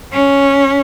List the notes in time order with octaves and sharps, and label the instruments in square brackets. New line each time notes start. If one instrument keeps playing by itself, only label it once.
[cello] C#4